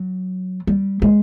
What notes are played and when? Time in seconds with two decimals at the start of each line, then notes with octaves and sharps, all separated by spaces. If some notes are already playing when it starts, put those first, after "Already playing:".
Already playing: F#3
0.67 G3
1.02 G#3